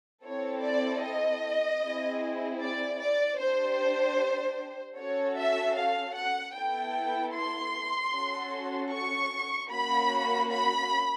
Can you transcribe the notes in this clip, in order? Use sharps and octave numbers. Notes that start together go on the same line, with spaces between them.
C4 E4 A4 C#5
D5
D#5
C4 E4 G#4
D5
D5
D4 C5
G4
C#4 F#4 A4 C#5
E5
F5
F#5
B3 E4 A4 G5
C6
C#4 F#4 A4
C#6
A#3 C#4 F#4 B5
B5